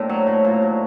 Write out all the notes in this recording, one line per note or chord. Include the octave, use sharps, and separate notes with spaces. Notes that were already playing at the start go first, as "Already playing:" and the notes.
Already playing: A2 A#3 C4 D4
F#3
A2
A#2
F#3